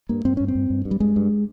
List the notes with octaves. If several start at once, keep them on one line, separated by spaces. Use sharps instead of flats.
G2 A#3
G2 C4
G2 C#4
C4
G2
G2
G2
G3
G2 G#3
G2